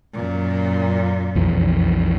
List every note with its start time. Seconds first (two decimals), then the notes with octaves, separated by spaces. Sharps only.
0.13 F#2 A#2
1.35 B1 F2 E3